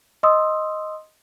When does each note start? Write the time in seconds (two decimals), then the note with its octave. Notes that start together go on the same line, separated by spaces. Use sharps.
0.23 D#5 C6 D#6 E6